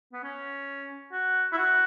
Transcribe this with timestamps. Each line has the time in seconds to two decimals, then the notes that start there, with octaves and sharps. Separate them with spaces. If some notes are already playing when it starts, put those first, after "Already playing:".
0.13 B3
0.23 C#4
1.12 F#4
1.52 E4
1.57 F#4